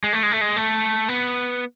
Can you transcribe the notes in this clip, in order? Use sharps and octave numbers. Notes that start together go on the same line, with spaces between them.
G#3
A3
G#3
A3
G#3
A3
B3